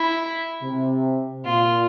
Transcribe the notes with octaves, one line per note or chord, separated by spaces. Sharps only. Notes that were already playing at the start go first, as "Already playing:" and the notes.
Already playing: E4
C3
A#2 F4